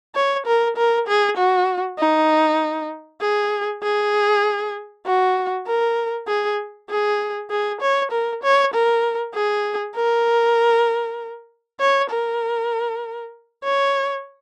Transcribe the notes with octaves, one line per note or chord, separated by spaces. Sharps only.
C#5
A#4
A#4
G#4
F#4
D#4
G#4
G#4
F#4
A#4
G#4
G#4
G#4
C#5
A#4
C#5
A#4
G#4
A#4
C#5
A#4
C#5